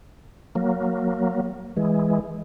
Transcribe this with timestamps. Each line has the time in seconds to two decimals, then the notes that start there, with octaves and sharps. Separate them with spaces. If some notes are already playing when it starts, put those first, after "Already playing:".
0.55 F#3 A#3
1.77 E3 G#3